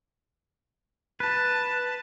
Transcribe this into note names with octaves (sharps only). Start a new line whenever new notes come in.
B4 A5